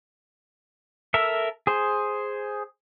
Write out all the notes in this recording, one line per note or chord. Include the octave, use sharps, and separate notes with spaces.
A4 A#4 E5
G#4 C5